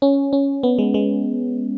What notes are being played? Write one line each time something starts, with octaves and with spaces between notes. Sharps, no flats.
C#4
C#4
B3
G#3
G#3